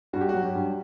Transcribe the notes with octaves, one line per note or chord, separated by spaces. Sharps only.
G2 F#4
G4
F#3 F#4
G4
G2